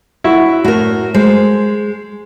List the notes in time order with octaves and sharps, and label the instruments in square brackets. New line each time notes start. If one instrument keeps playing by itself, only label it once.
[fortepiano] F#3 E4 F#4
[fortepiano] A2 [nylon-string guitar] F#4 A#4
[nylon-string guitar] G#3 [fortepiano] C5